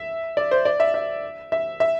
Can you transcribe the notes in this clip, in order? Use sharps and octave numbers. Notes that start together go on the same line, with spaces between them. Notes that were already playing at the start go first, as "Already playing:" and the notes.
Already playing: E5
D5
C5
D5
E5
E5
E5
E5